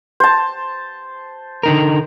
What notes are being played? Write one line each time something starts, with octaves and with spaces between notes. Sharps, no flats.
C5 A5
D3 D#4 A#4